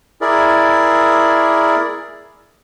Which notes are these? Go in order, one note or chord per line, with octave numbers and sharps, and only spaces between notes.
E4 G#4 A#4 D5